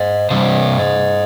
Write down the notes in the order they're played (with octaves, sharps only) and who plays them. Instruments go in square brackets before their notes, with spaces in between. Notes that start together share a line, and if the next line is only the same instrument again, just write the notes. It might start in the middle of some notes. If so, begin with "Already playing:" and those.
Already playing: [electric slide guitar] C5 D#5
C3 G3 C4 C5 D#5